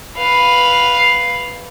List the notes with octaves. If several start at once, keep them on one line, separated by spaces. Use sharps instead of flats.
B4 F5